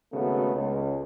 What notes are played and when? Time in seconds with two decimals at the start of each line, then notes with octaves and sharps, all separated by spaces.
0.12 G#1 C#3 A3 B3 F#4
0.54 C#2